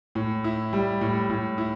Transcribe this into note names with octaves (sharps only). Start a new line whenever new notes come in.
A2
E4
G3
A2
A2
E4